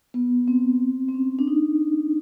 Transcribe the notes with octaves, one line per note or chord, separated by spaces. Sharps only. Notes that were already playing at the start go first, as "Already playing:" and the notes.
B3
C4
C4
C#4
D4
D#4